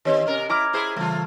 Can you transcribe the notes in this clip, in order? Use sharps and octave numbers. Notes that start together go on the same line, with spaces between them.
D#3 C4 G4 C#5 D#5
C3 C#4 A#4
E4 A#5 D6 F6
E4 G#4 C5
C#3 E3 G3 A3 F4